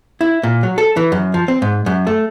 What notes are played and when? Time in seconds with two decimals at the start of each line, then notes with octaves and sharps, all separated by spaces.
0.21 E4
0.43 A#2
0.63 F#3
0.78 A4
0.97 E3
1.12 F#2
1.34 F3
1.48 C4
1.62 G#2
1.86 F#2
2.07 A3